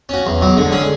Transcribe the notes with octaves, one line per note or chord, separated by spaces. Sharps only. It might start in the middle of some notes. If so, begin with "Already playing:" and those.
C#4 F#4
E2
B2 F#3
D3 G#3
C#4 G#4